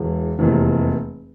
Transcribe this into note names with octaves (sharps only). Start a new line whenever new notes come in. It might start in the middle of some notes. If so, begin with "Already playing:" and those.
Already playing: E1 E2 E3
F1 E2 C3 E3 A#3